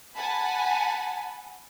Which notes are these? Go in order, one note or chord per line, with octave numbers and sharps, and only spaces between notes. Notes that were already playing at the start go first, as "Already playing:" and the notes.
F#5 G#5 A5 B5